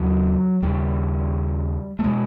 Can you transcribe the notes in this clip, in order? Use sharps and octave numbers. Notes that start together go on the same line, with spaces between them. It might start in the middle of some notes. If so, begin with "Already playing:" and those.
Already playing: D#2 C#3 F#3
D#2 C#3 G3
A3
B2 G#3